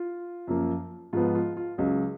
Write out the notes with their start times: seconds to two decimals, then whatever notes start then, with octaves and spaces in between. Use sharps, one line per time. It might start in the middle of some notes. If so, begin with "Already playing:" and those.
Already playing: F4
0.47 F#2 F3 A#3
1.13 G#2 F3 B3 F4
1.35 F4
1.57 F4
1.78 C#2 C#3 F#3